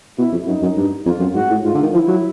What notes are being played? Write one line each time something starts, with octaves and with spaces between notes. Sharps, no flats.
B2 E4
F2
F#2 D#4
F#2
G2
F2 F4
F#2
G#2 F#4
A2
G#2 F4
D3
D#3
F3 E4
F#3